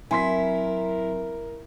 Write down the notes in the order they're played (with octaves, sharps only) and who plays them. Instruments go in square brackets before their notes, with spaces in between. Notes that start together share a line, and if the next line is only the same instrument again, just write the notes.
[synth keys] F#3 C4 [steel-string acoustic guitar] E4 [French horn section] A#4 [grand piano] G#5 C6 B6